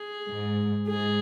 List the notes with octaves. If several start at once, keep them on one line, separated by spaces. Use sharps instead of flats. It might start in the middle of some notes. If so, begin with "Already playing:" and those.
Already playing: G#4
G#2
G#2 G#4